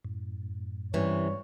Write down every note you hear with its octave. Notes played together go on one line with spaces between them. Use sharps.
F#2 A2
G2 C3 E3 C#4 C#5